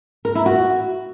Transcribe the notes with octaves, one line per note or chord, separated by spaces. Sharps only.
A#4
E4
F#4